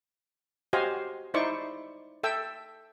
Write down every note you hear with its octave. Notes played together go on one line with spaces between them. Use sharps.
F#4 G4 C5 D#5 F5 G#5
D#4 E4 C5 D5 C#6
A4 E5 G5 E6